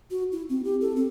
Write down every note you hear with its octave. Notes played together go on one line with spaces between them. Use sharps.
F#4
E4
C4
G4
A4
C4